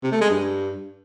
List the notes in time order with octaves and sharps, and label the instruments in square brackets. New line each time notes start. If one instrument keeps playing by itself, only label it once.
[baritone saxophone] C3
A3
G#3
G2